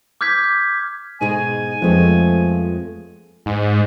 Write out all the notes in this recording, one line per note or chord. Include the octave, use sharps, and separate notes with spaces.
D6 F6 G6 G#6 B6
G#2 B2 G#3 G#4 G#5
F2 F3 G#3 A3 B3
G#2